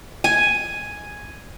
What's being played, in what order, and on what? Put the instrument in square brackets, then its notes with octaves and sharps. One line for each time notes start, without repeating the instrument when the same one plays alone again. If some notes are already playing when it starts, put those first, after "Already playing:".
[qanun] G#5